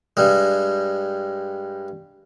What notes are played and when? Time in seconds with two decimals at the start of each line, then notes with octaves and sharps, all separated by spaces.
0.17 G2 G3 G#3